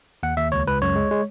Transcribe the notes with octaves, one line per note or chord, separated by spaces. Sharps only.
D#2 F#5
D#2 E5
C#2 C#5
C#2 B4
F#2 C#5
G#3
G#3